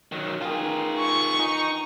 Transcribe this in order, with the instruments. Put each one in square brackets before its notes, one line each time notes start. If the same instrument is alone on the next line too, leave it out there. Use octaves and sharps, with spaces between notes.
[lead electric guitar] D#3 F#3
[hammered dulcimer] D#3 E3 [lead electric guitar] F4 G#4
[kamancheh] C#6
[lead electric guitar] D#4